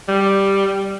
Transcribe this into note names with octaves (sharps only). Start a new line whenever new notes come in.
G3